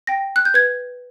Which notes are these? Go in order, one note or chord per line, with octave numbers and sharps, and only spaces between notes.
G5 A#6
F#6
G6
B4 G#6